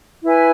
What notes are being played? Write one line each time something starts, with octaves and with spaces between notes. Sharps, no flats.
E4 B4 G#5